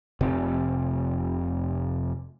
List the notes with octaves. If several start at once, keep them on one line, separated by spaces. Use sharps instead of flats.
F1 C3